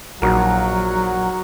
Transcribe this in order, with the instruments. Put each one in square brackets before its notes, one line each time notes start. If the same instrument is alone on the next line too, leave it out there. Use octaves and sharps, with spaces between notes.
[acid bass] A#1 [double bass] F#3 [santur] D#4 F#4 A#4